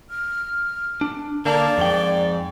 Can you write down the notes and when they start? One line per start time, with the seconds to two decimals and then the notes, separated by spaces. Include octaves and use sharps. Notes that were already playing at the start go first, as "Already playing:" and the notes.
0.10 F6
1.01 D4
1.45 D3 A#3 D5 A5
1.78 F2 G#2 G5